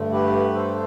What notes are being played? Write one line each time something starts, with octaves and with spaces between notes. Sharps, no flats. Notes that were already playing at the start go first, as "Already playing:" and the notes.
Already playing: G2 D3 A3
G4 B4
A4 C5